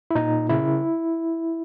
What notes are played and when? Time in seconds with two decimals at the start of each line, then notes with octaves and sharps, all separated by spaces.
0.11 E4
0.15 A#2 D#4
0.49 C#3 E4